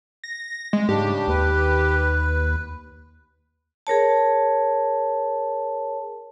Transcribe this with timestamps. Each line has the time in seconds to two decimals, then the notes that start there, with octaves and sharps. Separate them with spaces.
0.24 A#6
0.73 G#3
0.89 G#2 C#3 D4 G4
1.28 D#2 B4
3.87 G#4 A#4 C#5 A5